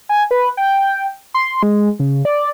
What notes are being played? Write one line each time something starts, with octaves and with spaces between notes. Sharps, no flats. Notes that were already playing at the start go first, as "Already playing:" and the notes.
G#5
B4
G5
C6
G#3
C#3
D5